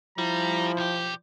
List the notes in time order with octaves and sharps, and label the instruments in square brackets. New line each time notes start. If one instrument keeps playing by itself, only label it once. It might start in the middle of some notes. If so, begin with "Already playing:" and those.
[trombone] F3 [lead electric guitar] G3 [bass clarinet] E4 [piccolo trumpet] A#5
[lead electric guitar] B1 G4 [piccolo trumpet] G6